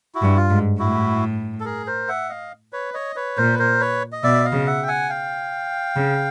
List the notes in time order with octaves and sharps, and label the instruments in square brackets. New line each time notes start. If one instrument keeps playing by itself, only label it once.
[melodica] E4 F#4
[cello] G2
[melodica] F4
[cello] G#2
[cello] A2 [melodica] E4 F#4
[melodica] A4
G#4 A#4
A#4 C5
E5 F#5
D#5 F5
B4 C#5
C#5 D#5
B4 C#5
[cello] A#2 [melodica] A#4 C5
[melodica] B4
A#4 C5
B4 C#5
D#5
[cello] B2 [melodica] D5 E5
[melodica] D#5 F5
[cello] C#3
[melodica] E5 F#5
G5
F#5 G#5
F5 G5
[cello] C#3